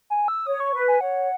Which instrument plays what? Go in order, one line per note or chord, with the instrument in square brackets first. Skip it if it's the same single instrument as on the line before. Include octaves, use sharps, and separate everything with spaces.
[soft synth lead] G#5
E6
[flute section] C#5 [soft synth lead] D#6
[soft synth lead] C#6
[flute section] B4
[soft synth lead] G#5
[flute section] C#5 [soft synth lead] F#5